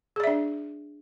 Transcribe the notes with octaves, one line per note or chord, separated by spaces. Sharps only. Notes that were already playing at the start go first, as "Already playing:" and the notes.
D4 G#4 D5 E5